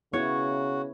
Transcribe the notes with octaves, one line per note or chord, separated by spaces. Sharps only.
C#3 B3 E4 F#4 C#5